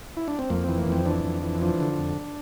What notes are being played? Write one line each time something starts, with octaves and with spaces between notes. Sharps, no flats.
E4
D4
C4
F2 A#3
E3 C4
A#3
F2 C4
E3 D4
F2
E3
F3 D4
D3
F2